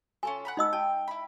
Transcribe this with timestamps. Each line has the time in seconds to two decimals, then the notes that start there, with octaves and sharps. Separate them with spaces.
0.23 C#4 F4 A4 G#5
0.45 F#5 A#5 B5
0.57 D#4 D#5 E6
0.73 G5 A5
1.08 E4 B5